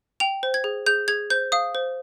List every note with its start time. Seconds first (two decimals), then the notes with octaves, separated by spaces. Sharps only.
0.20 G5 F7
0.43 C5
0.54 G#6
0.64 G#4
0.86 G#4 G6
1.08 G#4 G#6
1.30 C5 G6
1.52 F5 D#6
1.75 C5